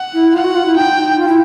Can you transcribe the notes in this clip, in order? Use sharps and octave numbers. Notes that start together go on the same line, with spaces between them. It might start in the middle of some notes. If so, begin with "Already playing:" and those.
Already playing: F#5
E4
F4 F#5
F#4
F4
E4
D#4 G5
F4
E4